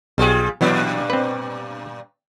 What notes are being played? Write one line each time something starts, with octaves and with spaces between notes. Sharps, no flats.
B1 G3 F4 G4 G#4
G2 A#2 E3 F#3 B3 D4
C4 B4